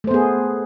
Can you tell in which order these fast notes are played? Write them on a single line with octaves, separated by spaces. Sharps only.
A3 C5 B3 G#4